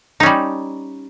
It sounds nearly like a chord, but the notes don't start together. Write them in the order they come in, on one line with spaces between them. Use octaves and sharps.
D#4 C#4 G3